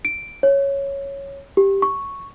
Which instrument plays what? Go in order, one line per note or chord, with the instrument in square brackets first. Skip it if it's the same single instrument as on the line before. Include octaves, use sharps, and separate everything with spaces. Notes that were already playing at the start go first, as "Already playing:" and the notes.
[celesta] D7
C#5
G4
C#6